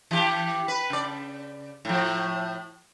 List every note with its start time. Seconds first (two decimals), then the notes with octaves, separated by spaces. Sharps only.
0.11 E3 G4
0.68 B4
0.90 C#3 D5
1.85 A2 F3